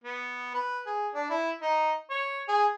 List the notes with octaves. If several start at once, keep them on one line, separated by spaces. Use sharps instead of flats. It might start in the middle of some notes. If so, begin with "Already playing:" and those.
B3
B4
G#4
D4
E4
D#4
C#5
G#4